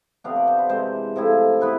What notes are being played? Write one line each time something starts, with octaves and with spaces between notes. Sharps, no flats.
C3 F3 B3 D4 F5
D5
C5
B4
C3 E3 G#3 C5
C3 F3 A3 E4
E3 B3 E4 B4